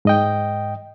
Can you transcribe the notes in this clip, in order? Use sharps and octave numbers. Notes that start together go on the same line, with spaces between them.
G#2 D#5 G5